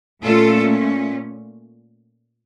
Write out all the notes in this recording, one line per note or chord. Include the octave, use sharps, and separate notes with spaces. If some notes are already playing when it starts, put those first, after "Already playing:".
A#2 A3 C#4 F4 A4